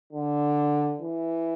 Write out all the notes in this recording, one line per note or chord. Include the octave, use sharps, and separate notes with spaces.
D3
E3